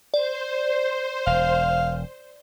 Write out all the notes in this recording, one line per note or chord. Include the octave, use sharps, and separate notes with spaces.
C5 D5
E1 F5